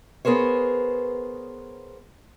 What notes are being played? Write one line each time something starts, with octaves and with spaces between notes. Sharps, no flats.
B3 G#4 A#4 C5 C#5